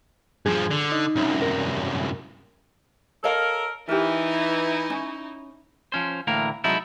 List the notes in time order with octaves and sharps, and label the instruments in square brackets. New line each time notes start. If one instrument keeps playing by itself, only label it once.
[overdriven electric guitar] G2 F3 [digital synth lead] G#4
[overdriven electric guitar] D3
[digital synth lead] D#4
[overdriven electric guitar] C2 F#2
[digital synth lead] A#4
[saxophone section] A4 A#4 [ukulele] C#5 D#5 F5
[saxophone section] E3 [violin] D#4 E4 [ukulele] G4 A#4
[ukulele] C#4
[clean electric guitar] F3 C#4 C5
D2 A2 E3 A#3 A#4
C3 F#3 G#3 D#4 E4 A4